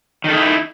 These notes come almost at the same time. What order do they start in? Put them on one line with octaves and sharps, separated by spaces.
D#3 A4 D#4 E4